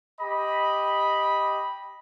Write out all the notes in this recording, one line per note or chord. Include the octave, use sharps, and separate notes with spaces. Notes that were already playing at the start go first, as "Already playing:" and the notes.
G4 D#5 B5